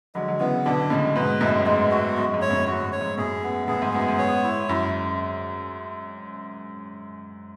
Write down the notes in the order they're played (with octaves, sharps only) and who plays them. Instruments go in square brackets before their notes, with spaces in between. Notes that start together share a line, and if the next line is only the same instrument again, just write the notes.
[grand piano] D3 F#3 [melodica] G#3
[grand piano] F#3
[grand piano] C#3 E3 [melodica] B3
[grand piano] B2 D3 [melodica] D4
[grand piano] A2 C#3 [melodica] G#3
[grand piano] G#2 B2 [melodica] B4
[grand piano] F#2 A2 [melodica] G#3
[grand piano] G#2 [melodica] G#3
[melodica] F#4
[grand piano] F#2 [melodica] G#3
[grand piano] G#2
[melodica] C#5
[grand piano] F#2 A2
[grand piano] G#2 [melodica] F#4
[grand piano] F#2
[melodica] C#5
[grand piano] G#2
[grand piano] F#2 A2 [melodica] G#4
[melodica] B3
[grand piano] A2 [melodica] G#4
[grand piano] G#2
[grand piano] F#2 [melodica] B3
[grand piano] G#2
[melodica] C#5
E4
[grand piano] F#2 [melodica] E4